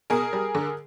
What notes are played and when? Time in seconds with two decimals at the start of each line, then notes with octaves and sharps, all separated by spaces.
0.10 B2 G#4 A#4
0.33 G3
0.55 D3